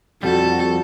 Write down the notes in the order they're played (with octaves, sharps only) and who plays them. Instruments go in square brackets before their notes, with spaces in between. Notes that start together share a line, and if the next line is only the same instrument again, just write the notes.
[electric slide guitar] F2 G3 [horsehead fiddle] F#4 [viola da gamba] A4